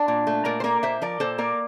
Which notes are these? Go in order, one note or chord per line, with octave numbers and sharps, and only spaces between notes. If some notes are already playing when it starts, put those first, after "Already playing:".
Already playing: D4
A#2
A3
A#2 A#4 D5
C5
A#3 A#4 D5
A#2 C5 E5
F3 A#4 D5
A#2 A4 C5
A#3 A#4 D5